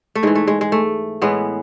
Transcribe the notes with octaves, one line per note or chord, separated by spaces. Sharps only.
A3
G#2 E3 G#3
A3
G#3
G#3
A3
A2 E3 G#3 B3